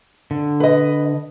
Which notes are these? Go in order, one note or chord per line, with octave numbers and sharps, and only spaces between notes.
D3
B4 D#5